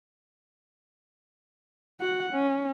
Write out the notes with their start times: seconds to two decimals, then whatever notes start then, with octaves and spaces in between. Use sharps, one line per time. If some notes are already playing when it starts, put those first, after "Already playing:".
2.01 F#4 F#5
2.33 C#4